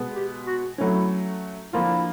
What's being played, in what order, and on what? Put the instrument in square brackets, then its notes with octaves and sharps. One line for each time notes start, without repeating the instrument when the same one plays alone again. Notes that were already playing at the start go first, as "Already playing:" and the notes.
Already playing: [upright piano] B2 G#3 B3
[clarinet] G4
F#4
[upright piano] F#3 A3 C#4 [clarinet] E4
[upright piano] D3 F3 A#3 D4 F4 [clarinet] E4